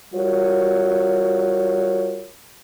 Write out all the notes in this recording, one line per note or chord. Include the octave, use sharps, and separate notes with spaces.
G3 F4 F#4 A#4 C#5